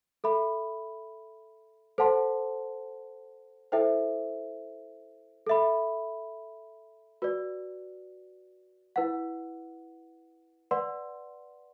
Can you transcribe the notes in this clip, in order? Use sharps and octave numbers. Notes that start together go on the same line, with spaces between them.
A4 E5 B5
A4 C5 F#5 A5 C6
E4 A4 C5 E5 G5
A4 E5 B5
F#4 B4 D5
E4 B4 F#5
B4 D5 F#5 C6